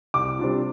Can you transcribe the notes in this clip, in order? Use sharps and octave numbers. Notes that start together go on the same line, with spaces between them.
C2 D6
C3 G3 D4 F4